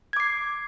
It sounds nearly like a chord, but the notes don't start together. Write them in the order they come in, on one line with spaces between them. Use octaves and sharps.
G#6 D6 C7